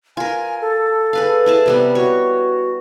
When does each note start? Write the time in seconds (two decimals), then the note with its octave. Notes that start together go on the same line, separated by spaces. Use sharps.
0.17 F4 A#4 G#5
0.61 A4
1.13 G#4 B4 F5
1.46 E4 G#4 A5
1.66 C3 G3 B3
1.95 F#4 C#5